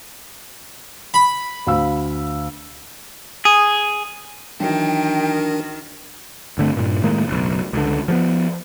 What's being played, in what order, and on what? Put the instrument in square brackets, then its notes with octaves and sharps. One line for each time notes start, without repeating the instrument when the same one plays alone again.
[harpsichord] B5
[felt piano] D2 F5 E6
[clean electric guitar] G#4
[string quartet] D#3 [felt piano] E3 F#3 F#4 [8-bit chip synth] D4 A#4 [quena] G5
[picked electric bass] G1 D3 A3 C4
G2 A#2
A2 D#3 G#3 A#3
F#1 B1
C#2 D3
F3 F#3 B3